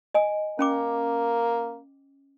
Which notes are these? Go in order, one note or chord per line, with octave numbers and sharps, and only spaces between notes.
D#5 G#5
A#3 C#4 G5 D6